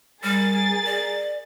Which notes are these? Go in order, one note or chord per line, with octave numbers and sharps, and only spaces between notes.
G3 G#4 A#4 A6
D5